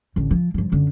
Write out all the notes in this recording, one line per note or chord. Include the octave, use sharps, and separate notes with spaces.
A1 D3
F3
G2 F3
F#2 D3